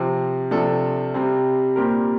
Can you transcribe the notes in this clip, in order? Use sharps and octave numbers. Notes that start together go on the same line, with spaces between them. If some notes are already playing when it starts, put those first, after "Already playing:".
Already playing: C3 F3 C4
C3 F3 A3 D4 A4
C3 G3 C4
A#2 G3 C4 G4 A#4